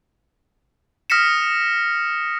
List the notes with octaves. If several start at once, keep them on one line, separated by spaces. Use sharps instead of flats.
D#6 F6 A#6 B6 C#7 E7